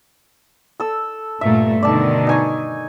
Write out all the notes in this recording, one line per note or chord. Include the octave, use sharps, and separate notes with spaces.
A4 E6
G2 A#2 A3 E5
B2 D3 D#3 D5 A5
D#4 G#5 C#6